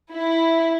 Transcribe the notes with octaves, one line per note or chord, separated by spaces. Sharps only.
E4